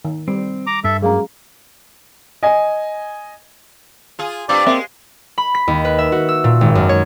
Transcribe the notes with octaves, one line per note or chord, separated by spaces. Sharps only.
D#3
G3 C4
A#5 D6
G2 A4 E5
F#3 G#3 A#3 C#4 G#4 F5 A#5
D#5 G#5
F4 G#4
G2 C4 F4 D5
G#3 A#3 C4 E5
B5
B6
D#2
B4
E5
F#4
E6
A#2
G#1
F#2
C#5